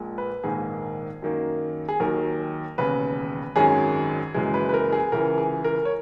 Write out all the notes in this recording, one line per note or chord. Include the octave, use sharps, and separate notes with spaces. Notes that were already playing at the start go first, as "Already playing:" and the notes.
Already playing: A#1 A#2 G#3
B4
A#1 G#2 D#3 A#3 G#4
F#2 D#3 A#3
G#4
D#2 D#3 F#3 A#4
E1 D#2 C#3 B4
G#1 F#2 D#3 G#3 C#4 G#4
F#1 F#2 E3 G#3
B4
B4
A#4
G#4
C#2 C#3 E3 A#4
G#4
A#4
C#5